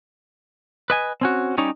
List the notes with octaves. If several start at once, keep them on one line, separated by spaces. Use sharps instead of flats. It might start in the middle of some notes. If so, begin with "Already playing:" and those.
B4 D#5 G#5
C4 C#4 F#4
G3 C#4 D#4 C#5